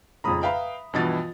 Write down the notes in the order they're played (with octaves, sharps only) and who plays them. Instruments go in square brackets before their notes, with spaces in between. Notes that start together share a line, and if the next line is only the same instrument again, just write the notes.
[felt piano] F2 G#2 C#3 [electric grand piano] A#5 B5 D#6
[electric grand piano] B4 F5 G5 [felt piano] E5 A#5 B5
[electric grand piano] G2 B2 E3 [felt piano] F3 D#5 A6